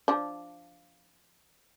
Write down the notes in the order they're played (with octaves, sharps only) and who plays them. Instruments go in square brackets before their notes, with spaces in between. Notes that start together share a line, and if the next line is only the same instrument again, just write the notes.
[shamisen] F3 D4